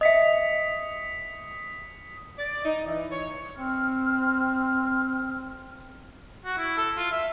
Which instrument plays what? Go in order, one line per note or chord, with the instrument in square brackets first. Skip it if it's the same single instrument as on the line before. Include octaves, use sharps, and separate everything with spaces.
[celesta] D#5 E5 [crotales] D#6 B6 C#7
[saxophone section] D5
D#4
E3
C#5
[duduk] C4 [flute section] F6
[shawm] F#4
E4
A4
F4
E5